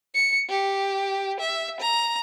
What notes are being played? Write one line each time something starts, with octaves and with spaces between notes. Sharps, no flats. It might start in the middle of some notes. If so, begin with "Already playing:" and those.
C#7
G4
E5
A#5